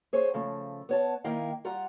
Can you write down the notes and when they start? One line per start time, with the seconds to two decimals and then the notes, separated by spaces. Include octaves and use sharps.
0.13 G#4 C5 C#5
0.34 C#3 F3 A3
0.89 B3 C#5 A5
1.24 D#3 A#3 E4 D#5 F5 G5
1.65 G3 F4 F#5 A#5